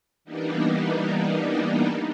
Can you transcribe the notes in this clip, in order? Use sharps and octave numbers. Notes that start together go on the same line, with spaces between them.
E3 G3 A#3 B3 D4 D#4